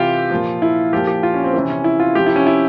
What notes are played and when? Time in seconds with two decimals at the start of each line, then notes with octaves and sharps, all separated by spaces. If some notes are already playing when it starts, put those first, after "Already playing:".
Already playing: C3 E3 F4 G4
0.30 A#2 F3
0.62 E4
0.93 A#2 F3 G4
1.07 G4
1.23 F4
1.34 C#4
1.44 C4
1.54 C3 E3 C#4
1.70 C#4
1.84 E4
2.00 F4
2.15 C3 F3 G4
2.26 E4
2.36 C#4
2.47 E4